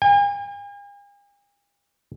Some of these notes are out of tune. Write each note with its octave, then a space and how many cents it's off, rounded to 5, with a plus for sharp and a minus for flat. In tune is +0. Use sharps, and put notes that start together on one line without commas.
G#5 -45